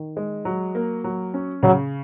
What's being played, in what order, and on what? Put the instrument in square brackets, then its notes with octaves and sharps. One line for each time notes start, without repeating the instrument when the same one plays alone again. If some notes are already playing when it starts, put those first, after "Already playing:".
Already playing: [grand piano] D#3
G#3
F#3
A#3
F#3
C#4
[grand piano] C#3 [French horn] F#3